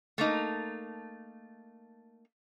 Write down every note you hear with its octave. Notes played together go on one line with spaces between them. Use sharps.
A3 A#3 D#4